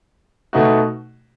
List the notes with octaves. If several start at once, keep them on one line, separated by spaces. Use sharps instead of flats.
B2 A3 D#4 F#4